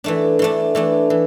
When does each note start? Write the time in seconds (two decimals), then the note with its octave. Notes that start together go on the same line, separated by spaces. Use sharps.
0.04 E3 A3 D4
0.39 E3 A3 D4
0.75 E3 A3 D4
1.10 E3